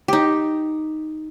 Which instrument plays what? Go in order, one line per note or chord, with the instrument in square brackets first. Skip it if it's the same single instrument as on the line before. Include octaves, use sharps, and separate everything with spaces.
[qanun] D#4 G4